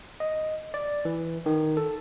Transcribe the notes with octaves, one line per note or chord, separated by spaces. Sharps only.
D#5
D5
E3
D#3
A4